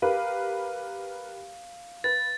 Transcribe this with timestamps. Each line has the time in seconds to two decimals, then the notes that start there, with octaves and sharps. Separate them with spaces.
0.02 G4 A#4 B4 F5
2.04 B4 A6